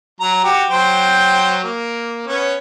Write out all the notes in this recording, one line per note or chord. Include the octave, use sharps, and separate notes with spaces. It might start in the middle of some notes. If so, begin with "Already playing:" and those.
F#3 A#5
F#4 G4
F#3 C5 G5
A#3
B3 C#4